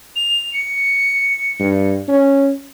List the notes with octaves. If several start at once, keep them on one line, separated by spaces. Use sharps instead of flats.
F7
C#7
G2
C#4